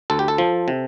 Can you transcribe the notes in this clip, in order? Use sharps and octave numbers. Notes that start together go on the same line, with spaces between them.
D2 A4
G4
A4
F3
C3